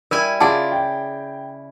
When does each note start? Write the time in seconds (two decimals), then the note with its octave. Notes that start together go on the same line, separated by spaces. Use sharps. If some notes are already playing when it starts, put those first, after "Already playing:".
0.11 G3 E4 A#4 G#5
0.40 C#3 E4 F4 G#4 D5 F#5 A5
0.72 G5